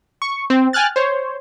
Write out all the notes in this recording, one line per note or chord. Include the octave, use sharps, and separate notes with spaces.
C#6
C4
G5 G#5 F6 F#6 A6
C5 C#5